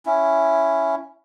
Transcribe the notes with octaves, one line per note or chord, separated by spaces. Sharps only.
C#4 E4